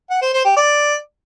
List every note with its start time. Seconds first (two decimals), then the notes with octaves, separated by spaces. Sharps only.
0.10 F#5
0.22 C5
0.33 C5
0.45 G4
0.57 D5